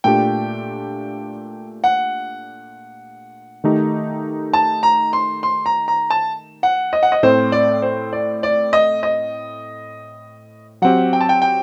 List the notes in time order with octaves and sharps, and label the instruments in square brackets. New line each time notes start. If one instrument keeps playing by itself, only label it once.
[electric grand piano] A#2 A3 D4 G4 [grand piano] G5
[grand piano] F#5
[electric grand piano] D#3 A3 D#4 G4
[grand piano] A5
A#5
C6
C6
A#5
A#5
A5
F#5
D#5
F#5
D#5
[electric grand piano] A2 A3 C4 [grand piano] C5
[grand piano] D5
C5
D5
D5
D#5
D#5
[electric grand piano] F#3 C4 G4 [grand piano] F#5
[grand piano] G5
A5
G5
G5